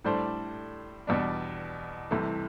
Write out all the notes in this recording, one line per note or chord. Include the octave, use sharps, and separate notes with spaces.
A2 G3 D4 A4 C5
E2 B2 G3 D4
C2 C3 E3 A3